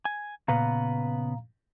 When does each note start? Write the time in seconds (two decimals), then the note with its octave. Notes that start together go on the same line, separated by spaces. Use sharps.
0.05 G#5
0.48 A#2 C#3 B3 B4 F5 A#5